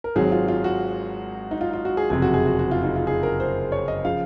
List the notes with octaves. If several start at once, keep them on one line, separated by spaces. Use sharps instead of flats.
A#4
G#1 G#2 F#3 C4 G#4
F4
F4
F#4
D#4
F4
F4
F#4
G#4
F#1 F2 C3 G#4
F#4
G#4
F#4
F#4
F4
D#4
F4
G#4
A#4
C5
C#5
D#5
C#3 F3 F5